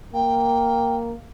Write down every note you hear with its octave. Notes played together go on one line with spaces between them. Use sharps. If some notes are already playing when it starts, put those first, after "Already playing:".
A#3 G5